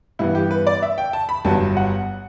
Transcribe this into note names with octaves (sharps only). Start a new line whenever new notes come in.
G2 E3 B3 E4
G4
B4
D5
E5
G5
A5
B5
G1 G2 F#3 B3 A5
F#5